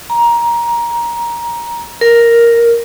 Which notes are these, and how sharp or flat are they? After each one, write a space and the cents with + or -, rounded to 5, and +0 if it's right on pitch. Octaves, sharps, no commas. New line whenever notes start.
A#5 +15
A#4 +0